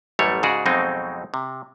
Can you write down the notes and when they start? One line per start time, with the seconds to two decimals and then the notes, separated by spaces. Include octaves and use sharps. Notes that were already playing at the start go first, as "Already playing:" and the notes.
0.19 A1 F#2 G3 A3 C#5
0.43 G#2 C#3 F#4 G#4 D5
0.66 F2 B2 F#3 G#3 C4 D#4
1.34 C3